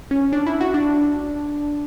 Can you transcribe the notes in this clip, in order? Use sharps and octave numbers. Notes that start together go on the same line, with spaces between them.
C#4
D4
E4
F#4
D4